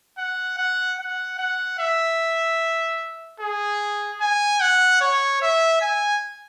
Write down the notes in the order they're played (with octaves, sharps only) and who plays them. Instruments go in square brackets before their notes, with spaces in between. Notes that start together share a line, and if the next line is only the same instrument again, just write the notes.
[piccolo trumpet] F#5
F#5
F#5
F#5
E5
G#4
G#5
F#5
C#5
E5
G#5